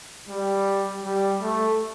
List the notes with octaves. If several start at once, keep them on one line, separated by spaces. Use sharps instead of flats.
G3
G3
A3